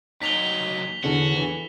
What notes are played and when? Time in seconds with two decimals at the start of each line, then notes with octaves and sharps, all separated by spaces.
0.22 D#2 F#3 D#4 B6 F7 G7
1.03 E2 D3 C#4 F#4
1.36 E3